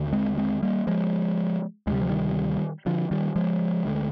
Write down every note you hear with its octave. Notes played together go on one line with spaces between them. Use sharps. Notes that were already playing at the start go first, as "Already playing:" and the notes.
Already playing: D#2 D3
G#3 C4
G#3 C4
G3 A#3
F3 G#3
D2 C3 G3 G#3
F3
D#3 G3
D3 F3
D#3 G3
F3 G#3
D2 D3